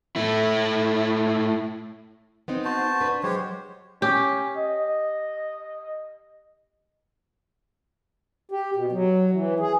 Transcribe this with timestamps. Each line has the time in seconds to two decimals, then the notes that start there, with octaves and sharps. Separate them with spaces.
0.16 A3 E4
2.48 B3 C4 D#4
2.65 F#4 C5 A5
3.00 D4 B4
3.23 F#3 G#3 G4 C5 C#5
4.02 C#4 G4
4.57 D#5
8.51 G4
8.76 B2
8.92 F#3
9.31 E3
9.60 G#4